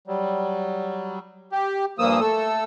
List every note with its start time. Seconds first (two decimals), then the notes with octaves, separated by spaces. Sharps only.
0.07 F#3 G3
1.52 G4
1.99 G2 A#2 F3 A#3 D#6 E6
2.20 A3 A4 E6